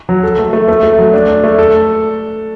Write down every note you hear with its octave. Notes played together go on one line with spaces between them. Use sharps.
F#3
A4
A3
A3
A3
A3
F#3
D4
D4
A3
A4